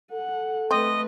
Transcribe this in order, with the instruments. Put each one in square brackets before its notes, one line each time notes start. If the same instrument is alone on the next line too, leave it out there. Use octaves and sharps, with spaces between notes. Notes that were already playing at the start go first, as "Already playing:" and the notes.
[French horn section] A4 [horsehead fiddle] F#5
[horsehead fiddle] A3 B4 [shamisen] C4 [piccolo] D#5